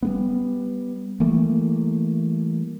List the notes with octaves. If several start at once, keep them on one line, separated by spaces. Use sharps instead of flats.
G3 A#3 B3
E3 G3 A3 A#3